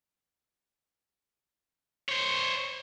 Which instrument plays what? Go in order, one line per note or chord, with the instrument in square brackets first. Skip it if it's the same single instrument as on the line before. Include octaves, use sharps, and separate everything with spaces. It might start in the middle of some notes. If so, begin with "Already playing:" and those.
[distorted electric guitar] C5 C#5